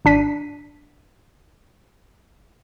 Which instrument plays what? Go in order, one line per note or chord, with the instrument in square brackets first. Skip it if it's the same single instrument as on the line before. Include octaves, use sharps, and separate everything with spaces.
[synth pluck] G#1 D4 B6 D#7